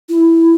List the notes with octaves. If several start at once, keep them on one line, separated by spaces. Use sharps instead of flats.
E4